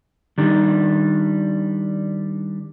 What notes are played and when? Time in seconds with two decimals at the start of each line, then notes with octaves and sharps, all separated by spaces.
0.38 D#3 G3 D4